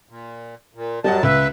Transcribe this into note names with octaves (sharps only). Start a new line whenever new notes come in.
A#2
A#2
F#2 F#3 G3 D#5 F#5 A5
C#2 B4 E5